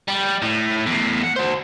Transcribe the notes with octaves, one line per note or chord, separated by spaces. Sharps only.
G3
A2
E2 A2
F#5
F#4 C5